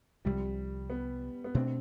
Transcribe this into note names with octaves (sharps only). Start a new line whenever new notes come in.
C2 C3 F3 G3
B3
B3
B2 A3 C4 D4